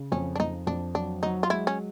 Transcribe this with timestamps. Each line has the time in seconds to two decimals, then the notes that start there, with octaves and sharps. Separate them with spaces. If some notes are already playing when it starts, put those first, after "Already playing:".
Already playing: C#3
0.12 F2 C#4
0.35 D4
0.40 F2 D#4
0.67 F2 D4
0.94 F#3 D4
1.23 F#3 D#4
1.43 F4
1.50 G#3 E4
1.67 C#4